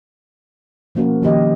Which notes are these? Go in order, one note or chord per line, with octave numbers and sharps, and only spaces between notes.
B2 F3 A#3 C#4 F#4 A#4
D#3 F3 A#3 G4 D#5